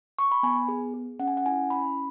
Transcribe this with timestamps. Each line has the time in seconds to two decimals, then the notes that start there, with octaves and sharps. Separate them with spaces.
0.19 C#6
0.32 B5
0.43 B3 G#5
0.68 G#4
0.94 G#4
1.19 C#4 F#5
1.28 G#5
1.37 F#5
1.46 E4 G#5
1.70 C#4 B5